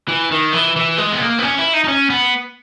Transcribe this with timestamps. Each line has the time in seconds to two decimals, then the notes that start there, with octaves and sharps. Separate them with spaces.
0.09 E3
0.31 D#3
0.53 E3
0.76 E3
0.98 G#3
1.13 B3
1.21 A#3
1.38 B3
1.43 C#4
1.58 E4
1.73 D#4
1.84 D#4
1.88 C#4
2.10 B3